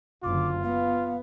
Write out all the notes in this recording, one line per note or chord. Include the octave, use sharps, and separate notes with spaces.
F#1 D3 F4 D6
B3 F5